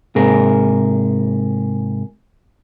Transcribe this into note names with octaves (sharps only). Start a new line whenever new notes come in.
G#2 C3 G#4 A#4